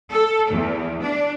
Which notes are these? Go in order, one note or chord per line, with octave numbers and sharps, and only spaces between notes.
A4
E2
D4